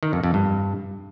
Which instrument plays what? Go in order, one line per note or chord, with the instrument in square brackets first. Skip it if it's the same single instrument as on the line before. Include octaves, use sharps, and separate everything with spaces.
[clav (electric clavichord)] D#3
F2
F2
G2